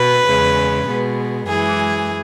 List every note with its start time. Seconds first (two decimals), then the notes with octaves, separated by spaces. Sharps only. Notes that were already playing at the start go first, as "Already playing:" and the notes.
Already playing: B2 B4
0.25 E2 C#3 G#3
0.87 B2 G#3 B3
1.47 F#2 E3 G#3 G#4